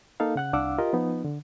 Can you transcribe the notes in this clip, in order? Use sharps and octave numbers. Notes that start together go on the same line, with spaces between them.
A#3 D#4 A4 F5
C#3 F#5 F#6
C2 D4 F5 F#5 D6 E6
F4 G4 A#4 D#5
F3 B3 D#4
D3